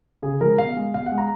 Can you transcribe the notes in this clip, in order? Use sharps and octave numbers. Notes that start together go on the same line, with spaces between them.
C#3 G#4
F3 G#3 A#4
B2 F5
G#3
B2 F5
F#5
G#3
A#5